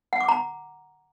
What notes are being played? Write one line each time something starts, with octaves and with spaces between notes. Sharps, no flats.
F#5
D6
A#5